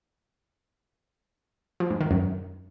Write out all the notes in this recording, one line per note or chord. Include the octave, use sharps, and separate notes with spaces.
F3
G#2
D#3
F#2